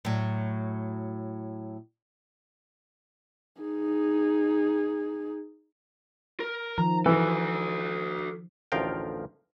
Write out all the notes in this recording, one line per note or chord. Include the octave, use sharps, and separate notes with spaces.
A2 F#3
D#4 G#4
A#4
D#3 F3 A#5
E3 F#4 A4
A1 D2 F3 A#4 F5 G5